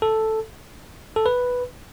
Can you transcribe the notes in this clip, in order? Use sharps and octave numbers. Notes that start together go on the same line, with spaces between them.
A4
A4
B4